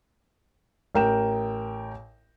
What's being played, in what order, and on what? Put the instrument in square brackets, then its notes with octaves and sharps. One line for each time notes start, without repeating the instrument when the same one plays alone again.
[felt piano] A1 A#4 G5 E7